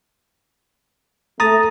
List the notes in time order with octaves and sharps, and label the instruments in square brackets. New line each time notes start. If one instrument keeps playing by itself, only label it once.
[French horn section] A3 [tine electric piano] A#5 D#6 A6